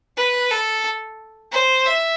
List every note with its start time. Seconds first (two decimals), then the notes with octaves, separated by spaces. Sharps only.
0.17 B4
0.51 A4
1.52 C5
1.86 E5